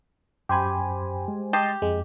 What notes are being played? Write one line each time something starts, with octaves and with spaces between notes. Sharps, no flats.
F#2 G4 C5 G#5 B5
G#3
G4 D#5 A5 C6
F2 G#3